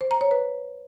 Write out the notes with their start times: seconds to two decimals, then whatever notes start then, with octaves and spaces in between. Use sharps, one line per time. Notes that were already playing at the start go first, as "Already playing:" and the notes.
0.01 C5
0.11 A#5
0.21 C#5
0.31 B4